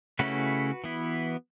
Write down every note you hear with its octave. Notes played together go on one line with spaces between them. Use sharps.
C#3 A3 C#4 E4 F#4 B4
E3 B3 E4